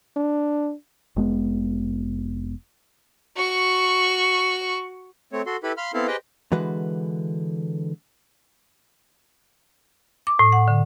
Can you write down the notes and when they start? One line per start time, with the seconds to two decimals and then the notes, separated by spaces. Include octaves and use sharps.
0.16 D4
1.16 F1 G#3 B3
3.37 F#4 C#6
5.33 A3 C4 C#5
5.46 F#4 A4 C6
5.63 E4 G4 A4 B4 B5
5.77 F5 B5 C6 F6
5.94 B3 C4 E4 A4 F5
6.07 G4 G#4 B4 C5 D#5 G5
6.52 D3 E3 G#3 F#4 B4
10.27 D6
10.39 A2
10.52 F#5
10.68 D3